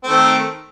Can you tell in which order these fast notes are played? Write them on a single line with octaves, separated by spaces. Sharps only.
C4 A3 D#3